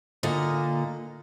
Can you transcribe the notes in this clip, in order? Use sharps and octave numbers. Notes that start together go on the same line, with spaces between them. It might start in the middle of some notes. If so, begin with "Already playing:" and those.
A#2 D3 A#3 D#5